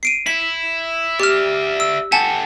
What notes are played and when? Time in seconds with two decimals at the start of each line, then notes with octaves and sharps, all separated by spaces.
0.03 C7 D7 D#7
0.27 E4 B6
1.20 G4 D5 E5 F6
1.80 E6
2.12 G4 A4 F#5 G#5 A5